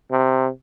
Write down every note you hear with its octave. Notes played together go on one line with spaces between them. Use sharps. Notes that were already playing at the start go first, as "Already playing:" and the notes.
C3